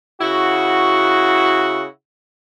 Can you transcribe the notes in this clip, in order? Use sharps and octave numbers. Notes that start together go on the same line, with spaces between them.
C#3 E4 F#4